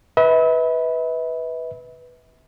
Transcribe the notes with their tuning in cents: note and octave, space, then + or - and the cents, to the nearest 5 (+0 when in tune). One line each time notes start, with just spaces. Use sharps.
B4 +0 E5 -40